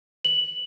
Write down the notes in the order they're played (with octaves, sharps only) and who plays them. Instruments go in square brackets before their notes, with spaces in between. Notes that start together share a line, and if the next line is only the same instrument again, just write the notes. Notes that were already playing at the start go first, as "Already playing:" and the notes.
[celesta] F#7